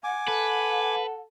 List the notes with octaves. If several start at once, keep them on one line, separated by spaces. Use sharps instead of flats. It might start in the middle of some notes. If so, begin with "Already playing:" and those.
F#5 G#5 D6
A4 B4